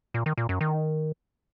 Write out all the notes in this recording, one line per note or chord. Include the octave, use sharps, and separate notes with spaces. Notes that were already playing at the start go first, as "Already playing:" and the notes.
A#2
D#3
A#2
F#2
D#3